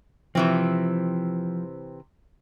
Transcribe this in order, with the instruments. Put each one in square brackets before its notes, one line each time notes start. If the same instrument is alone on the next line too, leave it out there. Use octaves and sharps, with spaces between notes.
[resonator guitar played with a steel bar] C3 E3 C4 [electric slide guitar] F3